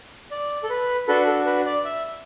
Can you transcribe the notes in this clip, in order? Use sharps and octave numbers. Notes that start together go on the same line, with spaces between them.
D5
A4
B4
D4 F#4 A4 B4
A4
B4
D5
E5